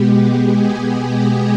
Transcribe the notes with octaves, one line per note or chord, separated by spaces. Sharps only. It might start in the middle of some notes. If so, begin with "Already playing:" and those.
Already playing: B2 G#3 B3 G4
G#4
G4